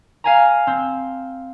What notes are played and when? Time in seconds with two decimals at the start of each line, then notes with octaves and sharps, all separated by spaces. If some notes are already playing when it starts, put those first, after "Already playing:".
0.24 F5 G#5 A#5
0.67 C4